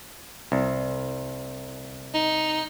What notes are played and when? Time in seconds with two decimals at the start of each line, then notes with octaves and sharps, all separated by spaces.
0.52 C2
2.14 D#4